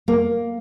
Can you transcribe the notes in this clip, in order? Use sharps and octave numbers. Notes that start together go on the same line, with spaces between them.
A#3